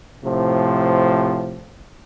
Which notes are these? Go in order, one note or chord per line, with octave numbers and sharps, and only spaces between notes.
A2 C3 F3